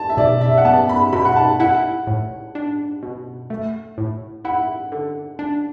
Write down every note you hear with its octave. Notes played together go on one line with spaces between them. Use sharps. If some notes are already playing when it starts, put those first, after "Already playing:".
Already playing: A5
E5
B2 D5
E5
F#5
B3 A5
B5
B2 B5
F#5
A5
E4 F#5
A2
D4
B2
A3
A2
E4 F#5
D3
D4